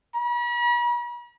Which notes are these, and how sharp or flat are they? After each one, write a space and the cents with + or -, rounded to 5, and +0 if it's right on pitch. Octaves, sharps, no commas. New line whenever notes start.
B5 -45